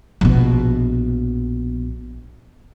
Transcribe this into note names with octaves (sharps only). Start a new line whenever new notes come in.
A#1 B2